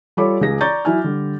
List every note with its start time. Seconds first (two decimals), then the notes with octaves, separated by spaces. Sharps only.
0.17 G3 F4 A4 C#5 B5 D6
0.41 C#2 G#4 A#6
0.61 D5 A#5 C#6 G6 A6
0.85 F#3 E4 G#5 F6
1.04 D3 G3